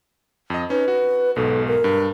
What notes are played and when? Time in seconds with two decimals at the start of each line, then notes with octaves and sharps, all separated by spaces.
0.50 F2 D#5
0.70 C#4 D#4 B4
0.88 F#4
1.36 B1 G#2 B2 A4
1.68 A#4
1.84 G2